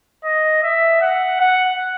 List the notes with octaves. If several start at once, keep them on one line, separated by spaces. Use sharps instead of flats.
D#5
E5
F#5
F#5